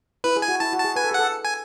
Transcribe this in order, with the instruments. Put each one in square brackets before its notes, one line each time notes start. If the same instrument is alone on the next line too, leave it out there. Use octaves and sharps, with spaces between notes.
[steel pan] E4 [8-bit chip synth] B4
[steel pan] G#4
[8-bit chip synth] G#5
[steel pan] F#4
[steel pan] E4 [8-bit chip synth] A5
[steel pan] F#4
[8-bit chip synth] A5
[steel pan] G#4
[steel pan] B4 [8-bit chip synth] G#5
[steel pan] A4
G#4
[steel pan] A4 [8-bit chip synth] F#5
[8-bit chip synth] G#5